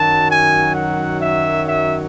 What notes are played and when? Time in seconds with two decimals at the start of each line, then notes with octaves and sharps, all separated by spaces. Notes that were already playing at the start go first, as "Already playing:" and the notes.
Already playing: F#2 D#3 F#3 A5
0.30 G#5
0.75 F#5
1.21 E5
1.66 E5